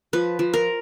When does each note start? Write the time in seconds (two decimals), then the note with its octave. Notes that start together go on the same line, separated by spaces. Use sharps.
0.13 F3 B4
0.39 F3
0.54 A#4